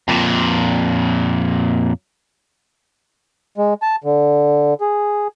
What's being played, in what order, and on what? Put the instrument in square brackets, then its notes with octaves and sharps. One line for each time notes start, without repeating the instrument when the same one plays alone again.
[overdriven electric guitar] F2 A#2
[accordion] G#3
A5
D3
G#4